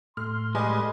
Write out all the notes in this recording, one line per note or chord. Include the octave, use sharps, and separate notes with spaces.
A2 A3 C6 F6
G3 G#3 B4 D#5 G#5